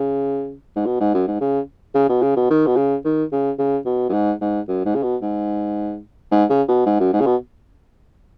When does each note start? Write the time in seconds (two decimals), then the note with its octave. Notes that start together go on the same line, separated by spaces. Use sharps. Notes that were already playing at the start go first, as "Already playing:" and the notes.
Already playing: C#3
0.76 G#2
0.86 B2
1.00 G#2
1.14 F#2
1.27 G#2
1.41 C#3
1.95 C#3
2.09 B2
2.22 C#3
2.37 B2
2.50 D#3
2.67 B2
2.77 C#3
3.05 D#3
3.32 C#3
3.59 C#3
3.86 B2
4.09 F#2
4.13 G#2
4.41 G#2
4.68 F#2
4.85 G#2
4.95 C#3
5.03 B2
5.22 G#2
6.32 G#2
6.50 C#3
6.68 B2
6.86 G#2
7.00 F#2
7.13 G#2
7.20 C#3
7.26 B2